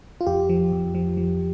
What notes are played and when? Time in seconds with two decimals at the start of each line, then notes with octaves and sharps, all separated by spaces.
0.21 F4
0.26 F2 G4
0.49 F3
0.72 F2
0.95 F3
1.17 F3